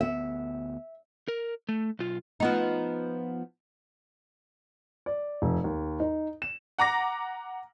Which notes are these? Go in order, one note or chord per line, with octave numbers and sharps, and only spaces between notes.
D2 B3 E5
A#4
A3
B1 F4
F3 B3 D#4
D5
F1
D#2
D#4
E7
F#5 A#5 D6 A#6